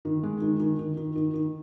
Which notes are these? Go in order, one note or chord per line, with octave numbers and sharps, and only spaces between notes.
D#3
G#3
D#3
D#3
D#3
D#3
D#3
D#3